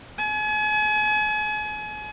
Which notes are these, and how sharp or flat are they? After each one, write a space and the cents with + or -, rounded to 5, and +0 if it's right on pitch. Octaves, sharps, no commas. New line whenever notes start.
G#5 +35